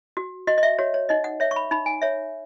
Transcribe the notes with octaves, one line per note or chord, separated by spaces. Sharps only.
F#4
F#4 D#5
D#5
E5
F#4 C#5
C#5
D#4 D#5
F#5
C#5 E5
C#6
B5
D#4 B5
G#5
C#5 E5